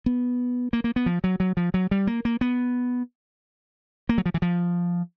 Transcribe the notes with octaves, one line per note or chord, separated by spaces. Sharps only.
B3
A#3
A#3
B3
F3
F#3
F#3
F3
F#3
G3
A#3
A#3
B3
A#3
F#3
F3
E3
F3